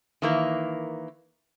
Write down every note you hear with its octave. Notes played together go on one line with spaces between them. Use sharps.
D#3 E3 A#3